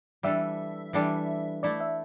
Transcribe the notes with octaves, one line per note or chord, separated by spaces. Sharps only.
E3 G3 D4 A4 E5
E3 G3 D4 A4
A3 E4 A4 D5
E5